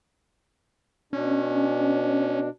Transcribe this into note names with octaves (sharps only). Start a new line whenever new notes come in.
B2 C#4 D4